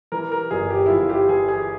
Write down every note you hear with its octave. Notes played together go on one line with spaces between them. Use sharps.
E3 A#4
A#4
G1 G#4
G4
E4
G1 F4
G4
E3 G#4
G#4